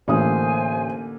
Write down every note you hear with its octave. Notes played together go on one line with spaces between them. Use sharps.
A1 D3 A#3 C5 G#5 D#6